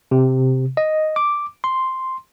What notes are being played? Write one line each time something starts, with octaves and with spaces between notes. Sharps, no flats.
C3
D#5
D6
C6